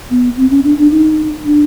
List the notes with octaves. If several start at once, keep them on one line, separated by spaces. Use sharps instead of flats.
B3
C4
C#4
D4
D4
D#4
D4